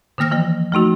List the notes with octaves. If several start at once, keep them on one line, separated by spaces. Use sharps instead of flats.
D3 D#3 A#3 F6 A#6
E3 F3 A#3
F3 A3 D#4 F#4